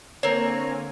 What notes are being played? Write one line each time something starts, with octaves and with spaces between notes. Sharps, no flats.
D3 A#3 C4 A#4 C#5 G#5